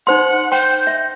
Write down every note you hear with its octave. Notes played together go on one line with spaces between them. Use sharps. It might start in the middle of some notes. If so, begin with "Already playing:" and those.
D#4 C5 F#5 C6
C5 G5 C6 G6
E5